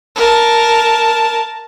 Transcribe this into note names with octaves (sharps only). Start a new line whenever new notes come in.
A#4 A5